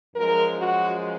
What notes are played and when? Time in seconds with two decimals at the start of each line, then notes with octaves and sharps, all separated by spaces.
0.15 F#2 F3 G#3 A#4
0.58 F#4